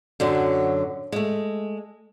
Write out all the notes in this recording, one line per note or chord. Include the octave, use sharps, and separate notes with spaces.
F#2 D3 F#3
G#3 A3